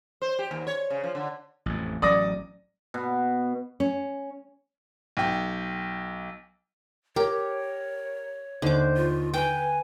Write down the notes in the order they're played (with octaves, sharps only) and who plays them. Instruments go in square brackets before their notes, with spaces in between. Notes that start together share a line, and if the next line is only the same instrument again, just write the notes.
[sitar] C5
G4
D#2
C#5
C#3
F3
D3
[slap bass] A1 F2
[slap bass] A1 F#3 C#4 [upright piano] D5 D#6 A#6
[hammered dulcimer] B2
[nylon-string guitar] C#4
[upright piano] B1 G5
[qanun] G4 [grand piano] A#4 [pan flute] C#5
[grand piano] D#2 [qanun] D3 D6 [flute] C5
[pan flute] F4
[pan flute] B4 [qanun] G5 [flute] G#5